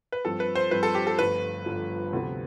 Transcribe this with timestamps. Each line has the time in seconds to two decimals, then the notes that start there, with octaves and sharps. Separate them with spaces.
0.12 B4
0.25 G2 F3 C4 A4
0.40 B4
0.56 C5
0.71 G2 F3 C4 B4
0.83 A4
0.95 G4
1.07 A4
1.18 G1 G2 F3 A3 B4
1.66 G1 G2 F3 A3
2.13 D2 C3 F3 B3